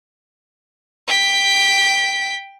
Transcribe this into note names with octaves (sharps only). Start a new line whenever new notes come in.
G5 B6